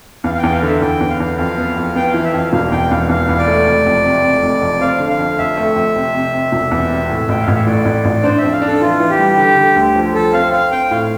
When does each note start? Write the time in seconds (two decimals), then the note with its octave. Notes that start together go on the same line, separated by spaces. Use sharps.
0.24 E2 F5
0.34 F5
0.38 G5
0.43 E2
0.53 F5
0.62 D3 E5
0.82 E2 G5
1.01 E2
1.10 F5
1.20 E2
1.38 F2 F5
1.57 B3
1.77 F2
1.95 B3 G5
2.10 E3 F5
2.24 E5
2.34 F2 F5
2.53 E1 F5
2.72 E2 G5
2.91 E2 F5
3.09 E2 F5
3.29 E2
3.38 D5
3.48 A3
3.67 F1
3.86 F2
4.05 C3
4.23 F2
4.43 F1
4.62 F2
4.81 C4 F5
5.00 D3
5.09 F5
5.19 F2
5.38 F2 E5
5.57 A3
5.76 F2
5.96 C3
6.15 C3
6.34 C3
6.52 E1
6.71 E2
6.90 C3
7.09 A2
7.29 A1 G5
7.42 F5
7.48 A1
7.54 E5
7.66 A2 D5
7.85 A1
8.05 A1
8.24 D4 C5
8.38 F2 E5
8.53 F5
8.61 D4
8.67 A4
8.81 E3 F4
9.00 E3
9.10 G4
9.18 G3
9.38 D3
9.57 D3
9.76 D2
9.95 F3
10.14 F3 A4
10.33 C4 F5
10.52 C4 F5
10.71 C4 G5
10.90 A2 F5